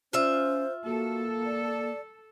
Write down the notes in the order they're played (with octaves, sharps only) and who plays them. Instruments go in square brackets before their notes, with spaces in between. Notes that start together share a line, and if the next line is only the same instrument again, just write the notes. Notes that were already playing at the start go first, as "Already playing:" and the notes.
[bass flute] C#4 [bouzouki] F4 E5 [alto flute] C5
[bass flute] A#3 [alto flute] F#4 [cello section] A4
[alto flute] D5